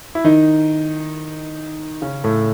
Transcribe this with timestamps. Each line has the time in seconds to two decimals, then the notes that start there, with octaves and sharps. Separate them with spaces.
0.15 E4
0.24 D#3 D#4
2.02 C#3 C#4
2.24 A2 A3